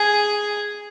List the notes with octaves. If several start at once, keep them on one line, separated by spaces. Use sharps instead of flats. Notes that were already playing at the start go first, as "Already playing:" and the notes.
Already playing: G#4